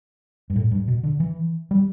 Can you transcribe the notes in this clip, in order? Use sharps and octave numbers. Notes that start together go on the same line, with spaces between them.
G2
A2
G2
B2
D3
E3
G3